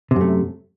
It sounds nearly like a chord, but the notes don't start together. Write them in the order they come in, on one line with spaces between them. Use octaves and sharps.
C3 F#2 A3